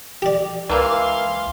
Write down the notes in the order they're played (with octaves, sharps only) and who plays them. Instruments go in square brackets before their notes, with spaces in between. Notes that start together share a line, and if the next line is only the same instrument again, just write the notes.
[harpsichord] G4 D5
[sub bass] C#2 [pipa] E3 A#3 E5 [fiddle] F5 C6